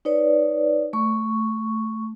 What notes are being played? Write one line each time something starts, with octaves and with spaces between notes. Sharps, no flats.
D#4 B4 C#5 D5
A3 C#6